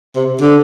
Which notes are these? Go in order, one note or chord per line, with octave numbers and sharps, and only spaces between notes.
C3
D3